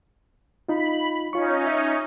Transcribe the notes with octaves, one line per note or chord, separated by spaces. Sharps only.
D#4 F4 B5
C#4 D#4 F4 C#6
E5